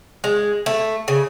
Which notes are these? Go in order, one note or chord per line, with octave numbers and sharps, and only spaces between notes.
G#3
A3
C#3